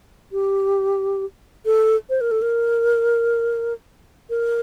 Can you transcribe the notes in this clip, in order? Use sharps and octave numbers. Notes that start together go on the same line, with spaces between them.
G4
A4
C5
A#4
A4
A#4
A#4